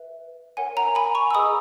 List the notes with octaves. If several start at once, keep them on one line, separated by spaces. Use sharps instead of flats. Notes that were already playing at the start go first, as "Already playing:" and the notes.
Already playing: B4 E5
A#4 C#5 F#5 G#5
A#5
G#5 B5
A#5 C#6
E6
G#4 B4 D#5 F#5 B5 D#6